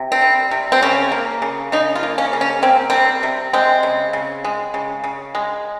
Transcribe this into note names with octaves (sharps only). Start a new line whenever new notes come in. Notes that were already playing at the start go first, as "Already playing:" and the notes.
Already playing: C3
C4
G3
C3
C4
C#3 C#4
A#3
C#3
C#3 D#4
F4
A#3
C#4
C#3
C#4
A#3 C4
G3 C4
C3
G#3 C4
C#3
C#3
G#3
C#3
C#3
G#3